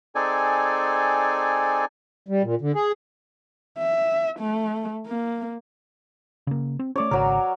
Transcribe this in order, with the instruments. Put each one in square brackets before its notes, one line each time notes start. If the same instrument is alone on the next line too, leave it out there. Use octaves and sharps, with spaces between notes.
[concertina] C4 D#4 G#4 A4 D5 G#5
[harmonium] G3
A#2
D3
G#4
[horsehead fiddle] E5
A3
A#3
[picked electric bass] C#3 A#3
C4
[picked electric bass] A3 C#4 [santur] C#5 D5
[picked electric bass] G#1 C#3 [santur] F#3 A#4